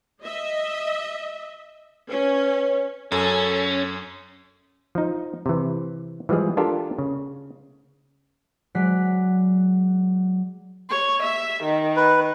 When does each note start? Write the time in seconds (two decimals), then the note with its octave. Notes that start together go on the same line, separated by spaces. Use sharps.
0.24 D#5 E5
2.09 C#4 B4 C#5
3.12 F#2 C#4 A4
4.95 F3 D#4
5.46 C3 E3
6.29 E3 F3 G3 G#3 G#4
6.57 D4 F4 G4 A4 A#4
6.99 C#3
8.75 F#3 G#3 D5 F#6 B6 C7
10.90 C#5
11.23 E5
11.64 D#3
11.96 B4